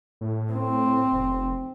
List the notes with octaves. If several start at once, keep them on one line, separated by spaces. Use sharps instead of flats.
A2
C4
F1